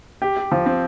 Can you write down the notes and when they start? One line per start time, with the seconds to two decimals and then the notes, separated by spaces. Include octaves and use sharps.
0.22 G4
0.37 G4
0.52 F3
0.66 C4